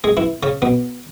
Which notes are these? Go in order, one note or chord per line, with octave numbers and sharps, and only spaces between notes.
G#3 G#4
E3 E4
C#3 C#4
B2 B3